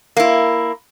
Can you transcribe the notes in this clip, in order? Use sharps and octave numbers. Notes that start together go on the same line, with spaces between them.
A#3 E4